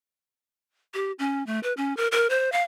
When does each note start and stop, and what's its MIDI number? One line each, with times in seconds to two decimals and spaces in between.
0.94 1.12 67
1.19 1.45 61
1.47 1.60 57
1.63 1.73 71
1.77 1.95 61
1.97 2.08 70
2.12 2.27 70
2.30 2.52 72
2.52 2.62 77